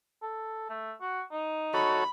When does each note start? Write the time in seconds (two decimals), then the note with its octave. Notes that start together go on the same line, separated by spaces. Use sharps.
0.22 A4
0.70 A3
1.01 F#4
1.32 D#4
1.74 F#4 A4 C#5 B5